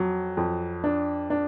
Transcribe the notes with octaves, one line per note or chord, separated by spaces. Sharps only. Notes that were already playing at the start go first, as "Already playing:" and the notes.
Already playing: F2 F#3
F2
D4
D4